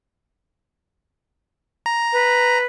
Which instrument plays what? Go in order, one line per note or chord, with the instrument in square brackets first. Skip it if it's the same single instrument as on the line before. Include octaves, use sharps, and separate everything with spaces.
[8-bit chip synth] A#5
[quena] B4